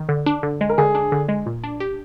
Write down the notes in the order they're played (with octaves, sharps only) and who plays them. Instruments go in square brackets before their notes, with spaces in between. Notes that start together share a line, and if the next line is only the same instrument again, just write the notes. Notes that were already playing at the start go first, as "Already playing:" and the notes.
Already playing: [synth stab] D#3
D3
D4
D3
G#3
[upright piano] A#4
[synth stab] D3 [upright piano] G#4
[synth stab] D4
D3
G#3
A#2
D4
G4